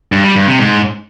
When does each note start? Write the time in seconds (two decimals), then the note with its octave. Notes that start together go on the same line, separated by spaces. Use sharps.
0.12 G2
0.24 G3
0.36 G2
0.47 C3
0.59 G#2